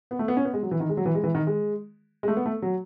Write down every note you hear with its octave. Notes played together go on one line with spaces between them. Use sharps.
B3
A3
B3
C#4
B3
G#3
F#3
E3
D#3
G#3
F#3
E3
G#3
E3
D#3
G#3
G#3
A3
B3
A3
F#3